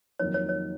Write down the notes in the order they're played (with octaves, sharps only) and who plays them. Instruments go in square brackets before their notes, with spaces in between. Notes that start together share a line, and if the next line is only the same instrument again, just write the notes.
[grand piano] F2 D#3 F#3 A#3 D#4 [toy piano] C#5
[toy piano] C#5
C#5